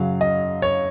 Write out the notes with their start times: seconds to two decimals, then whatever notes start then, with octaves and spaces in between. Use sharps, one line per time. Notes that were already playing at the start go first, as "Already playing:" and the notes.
Already playing: F#2 C#3 F#3 F5
0.21 D#5
0.62 C#5